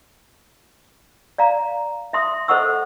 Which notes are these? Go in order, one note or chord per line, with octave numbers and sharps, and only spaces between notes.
D5 F5 A#5
E5 C6 D#6
A4 C5 D#5 F#5 C#6 E6